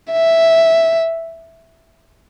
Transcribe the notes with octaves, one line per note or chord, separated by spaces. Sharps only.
E5